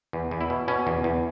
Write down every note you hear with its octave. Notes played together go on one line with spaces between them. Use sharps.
E2
E2
E4
B2
B2 C#4
E2
E2